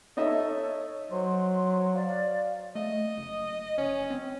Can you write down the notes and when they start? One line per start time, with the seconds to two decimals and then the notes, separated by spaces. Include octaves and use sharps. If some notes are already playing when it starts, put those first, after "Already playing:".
0.17 D#4 A4 C#5 D#5 E5
1.12 F#3 C5 C6
1.95 D5 F5
2.75 A3 D#5
3.17 F#1
3.78 F#1 C#4
4.10 C4